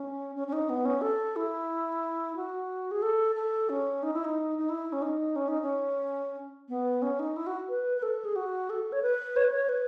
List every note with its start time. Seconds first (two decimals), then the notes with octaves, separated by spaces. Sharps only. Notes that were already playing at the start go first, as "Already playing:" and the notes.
Already playing: C#4
0.36 C#4
0.47 C#4
0.53 D#4
0.69 B3
0.85 C#4
1.01 A4
1.36 E4
2.36 F#4
2.91 G#4
3.02 A4
3.36 A4
3.69 C#4
4.03 D#4
4.14 E4
4.25 D#4
4.58 D#4
4.69 E4
4.93 C#4
5.02 D#4
5.36 C#4
5.48 D#4
5.62 C#4
6.69 B3
7.02 C#4
7.19 D#4
7.36 E4
7.47 F#4
7.69 B4
7.97 B4
8.03 A4
8.25 G#4
8.36 F#4
8.70 A4
8.92 C#5
9.02 B4
9.36 C#5
9.44 B4
9.51 C#5
9.69 B4